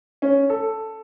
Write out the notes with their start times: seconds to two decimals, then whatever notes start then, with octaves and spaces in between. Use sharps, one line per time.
0.22 C#4
0.50 A4